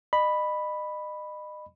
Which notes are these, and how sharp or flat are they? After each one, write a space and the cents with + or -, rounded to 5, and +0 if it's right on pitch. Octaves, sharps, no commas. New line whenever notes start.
D#5 -35 B5 +0